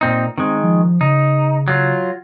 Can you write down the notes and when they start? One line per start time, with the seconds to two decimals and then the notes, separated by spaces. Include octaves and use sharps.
0.01 A#2 C4 D#4
0.38 D#3 G#3 C4
0.63 F3
1.01 C#3 D#4
1.68 F#3 F4